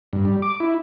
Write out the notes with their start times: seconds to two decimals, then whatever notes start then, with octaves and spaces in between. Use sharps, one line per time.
0.13 G2
0.25 G3
0.42 D6
0.60 E4